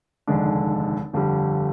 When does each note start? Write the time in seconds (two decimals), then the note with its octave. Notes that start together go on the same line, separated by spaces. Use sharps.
0.27 F1 D#2 D3 G#3 D4
1.13 G1 F2 D3 G3